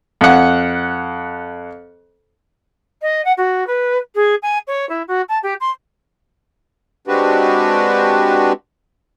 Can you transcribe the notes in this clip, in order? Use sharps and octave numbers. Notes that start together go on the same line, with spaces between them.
F2 F#5
D#5
F#5
F#4
B4
G#4
G#5
C#5
E4
F#4
A5
G4
C6
G#3 C4 D4 F#4 G4 B4